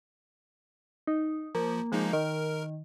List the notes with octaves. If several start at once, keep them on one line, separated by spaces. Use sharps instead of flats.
D#4
F3 A#3
F3 G#3 A#3 D#4
D#3 A#4